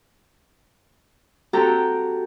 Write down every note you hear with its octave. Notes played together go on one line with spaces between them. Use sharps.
C4 F#4 G4 A4 G5 A#5